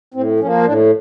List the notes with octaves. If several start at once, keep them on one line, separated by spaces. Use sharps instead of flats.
A2 C4
F3 A#3 C#4
A2 D4